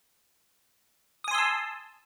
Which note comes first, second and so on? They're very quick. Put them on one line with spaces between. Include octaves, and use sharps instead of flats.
D#6 G#5 C6 E6 A5